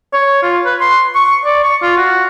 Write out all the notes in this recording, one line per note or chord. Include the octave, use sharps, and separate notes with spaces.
C#5
F4
B4
C6
C#6
D5
C#6
F4
F#4